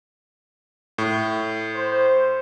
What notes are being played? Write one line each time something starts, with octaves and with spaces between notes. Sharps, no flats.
A2
C5